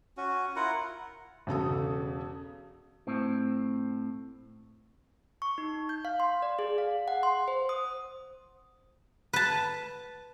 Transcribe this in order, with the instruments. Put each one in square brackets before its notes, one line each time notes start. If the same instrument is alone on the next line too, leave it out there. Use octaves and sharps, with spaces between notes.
[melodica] C#4 F#4
E4 F4 A#4 F#5
[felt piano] E1 C#3 A4 D#6
[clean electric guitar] A2 C4
[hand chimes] C#6
D#4
G6
F5
C6
D5
G#4
F5
F#5
C6
C5
D#6
[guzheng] B4 A5